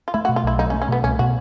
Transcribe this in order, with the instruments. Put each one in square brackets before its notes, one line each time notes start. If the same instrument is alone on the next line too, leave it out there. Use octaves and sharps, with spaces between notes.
[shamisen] F4
[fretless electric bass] A3 [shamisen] E4
[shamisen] F#4
[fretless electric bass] B2
[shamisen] F4
[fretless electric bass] B1 [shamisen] E4
[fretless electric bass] F#3 [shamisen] D#4
[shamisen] C#4
[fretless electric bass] A3
[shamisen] C#4
[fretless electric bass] B2 [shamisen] B3
[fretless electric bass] C2 [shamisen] C#4
[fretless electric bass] B2 [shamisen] F#4